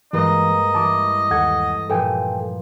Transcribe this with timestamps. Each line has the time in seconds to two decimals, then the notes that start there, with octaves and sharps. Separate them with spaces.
0.13 G2 E3 G#3 A#3 D#5
0.75 E3 G3 A5 D6
1.31 D#2 A4 F#5 G#6
1.90 G2 A#2 F3 A4 G5 G#5